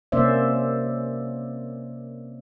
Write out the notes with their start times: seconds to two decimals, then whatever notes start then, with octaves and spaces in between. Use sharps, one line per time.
0.12 C3 A#3 C#4 C5 D5 E5